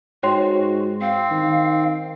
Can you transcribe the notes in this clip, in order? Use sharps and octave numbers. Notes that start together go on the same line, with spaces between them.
G#2 F#4 C#5 G5 C6
C4 F5
D#3